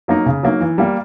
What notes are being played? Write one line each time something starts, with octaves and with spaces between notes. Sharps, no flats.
F#3 A#3 D#4
C#3
F#3 A#3 D#4
E3
G3 A#3